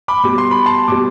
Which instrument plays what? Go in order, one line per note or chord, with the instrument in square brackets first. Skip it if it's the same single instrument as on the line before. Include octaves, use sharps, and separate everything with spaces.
[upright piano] B5 D6
B2 G3 D6
C6
B5
A5 C6
B2 G3 D6